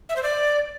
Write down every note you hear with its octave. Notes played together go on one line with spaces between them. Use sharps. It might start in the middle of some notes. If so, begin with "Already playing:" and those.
E5
C5
D5